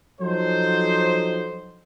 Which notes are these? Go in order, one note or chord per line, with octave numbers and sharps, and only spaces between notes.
F3 F#3 D#4 A4 C5